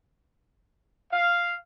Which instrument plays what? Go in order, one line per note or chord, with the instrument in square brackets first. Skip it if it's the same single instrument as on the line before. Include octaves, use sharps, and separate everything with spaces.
[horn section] F5